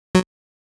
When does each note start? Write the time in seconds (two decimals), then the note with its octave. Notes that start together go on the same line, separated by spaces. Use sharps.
0.15 F#3